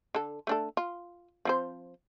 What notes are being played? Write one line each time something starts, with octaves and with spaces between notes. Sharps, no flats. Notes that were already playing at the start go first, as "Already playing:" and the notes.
D3 A4
A3 D4 A4
F4
F3 C4 C5